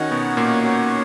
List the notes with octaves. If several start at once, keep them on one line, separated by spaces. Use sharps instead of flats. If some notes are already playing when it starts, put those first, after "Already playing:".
Already playing: D#3 C#4 D#4 F#4 C#5 F#5
B2 B3
A#2 A#3
C#4 F#4 C#5 F#5